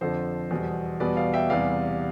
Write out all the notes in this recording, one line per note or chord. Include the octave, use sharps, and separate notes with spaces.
F2 D3 F3 A4 C5
E2 B2 G3
E2 B2 G3 B4 D5
D5 F5
E5 G5
E2 C3 E3 G3 D5 F5